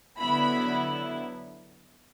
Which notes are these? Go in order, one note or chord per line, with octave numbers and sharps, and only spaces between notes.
D3 F#3 B3 E4 B5